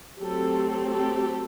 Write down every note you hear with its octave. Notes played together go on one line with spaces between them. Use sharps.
F#3 A3 C4 G4 A4
G4 A4